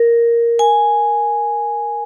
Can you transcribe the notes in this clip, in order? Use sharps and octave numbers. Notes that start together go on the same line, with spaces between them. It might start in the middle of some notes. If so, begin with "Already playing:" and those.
Already playing: A#4
G#5